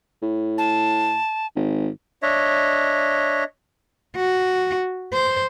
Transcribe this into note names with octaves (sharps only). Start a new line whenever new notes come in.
A2
A5
G#1
D4 C#5 D#5 E5
F#4
C5